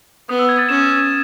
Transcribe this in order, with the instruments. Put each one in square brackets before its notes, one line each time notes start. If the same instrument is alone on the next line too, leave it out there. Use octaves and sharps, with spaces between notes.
[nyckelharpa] B3 [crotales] D#6
[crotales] E6
G#6
A6
[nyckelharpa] C#4 [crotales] E7